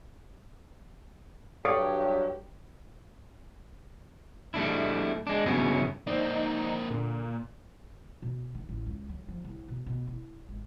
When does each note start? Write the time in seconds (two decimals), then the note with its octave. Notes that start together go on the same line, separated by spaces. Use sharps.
1.65 G2 F#3 G4 A4 C#5 D5 F5
4.54 G3 A3 D4 E4
5.27 G#3 D4
5.46 G2 C#3 F#3 B3 C#4 E4
6.07 A#3 C4 D#4 C5 D5
6.90 A#2 D3
8.22 B2
8.55 D#4
8.69 A1
8.87 C#2
9.09 F#3
9.28 F3
9.44 C2
9.68 B2
9.86 B2
10.07 E4
10.49 G#1